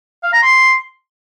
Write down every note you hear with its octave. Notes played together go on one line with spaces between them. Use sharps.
F5
A#5
C6